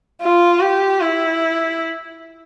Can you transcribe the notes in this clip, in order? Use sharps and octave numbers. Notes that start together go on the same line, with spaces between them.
F4
G4
E4